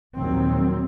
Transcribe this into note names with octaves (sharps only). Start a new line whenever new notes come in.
A#1 D#2 D#3 F#3 C4